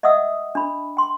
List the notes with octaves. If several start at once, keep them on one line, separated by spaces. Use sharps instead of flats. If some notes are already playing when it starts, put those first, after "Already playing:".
D#5 E5 F#5 D#6 E6
D4 B5
G5 C6